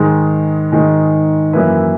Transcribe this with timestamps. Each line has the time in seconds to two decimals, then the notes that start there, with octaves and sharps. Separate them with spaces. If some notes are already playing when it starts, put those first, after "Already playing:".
Already playing: G#2 D#3 G#3
0.72 G#2 D#3 G#3
1.53 F#2 E3 A#3 E4 B4